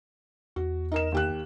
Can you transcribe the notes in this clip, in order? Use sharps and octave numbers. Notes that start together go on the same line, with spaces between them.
E2 F#4
D#4 A#4 E7
D#2 G4 F#6